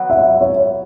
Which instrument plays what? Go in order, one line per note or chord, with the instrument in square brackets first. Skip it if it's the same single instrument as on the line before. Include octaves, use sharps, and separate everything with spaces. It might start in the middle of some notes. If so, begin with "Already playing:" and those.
Already playing: [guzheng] F#3 B3 F#4
[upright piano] E5
C#5